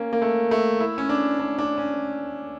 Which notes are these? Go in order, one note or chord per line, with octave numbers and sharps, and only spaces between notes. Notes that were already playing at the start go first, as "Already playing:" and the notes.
Already playing: A#3 C#4
A#3
A3
A3
E4
C#4
D4
D4
D4
C#4